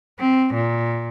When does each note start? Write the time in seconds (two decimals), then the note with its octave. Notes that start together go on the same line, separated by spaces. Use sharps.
0.19 C4
0.54 A#2